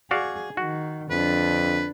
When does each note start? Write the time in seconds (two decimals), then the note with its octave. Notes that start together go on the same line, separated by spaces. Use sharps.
0.11 F#4 G#4 D5 F5
0.57 D#3 F#4
1.11 F2 D3 D4 B4